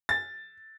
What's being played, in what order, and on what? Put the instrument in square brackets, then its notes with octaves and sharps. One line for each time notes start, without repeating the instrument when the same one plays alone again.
[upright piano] A6